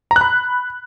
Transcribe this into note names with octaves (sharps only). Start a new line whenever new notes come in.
A#5
F#6
B5